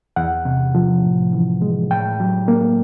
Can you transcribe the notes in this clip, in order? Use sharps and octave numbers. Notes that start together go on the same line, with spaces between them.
E2 F#5
C3
F3
A2
E3
G#3
A2 G5
F#3
A#3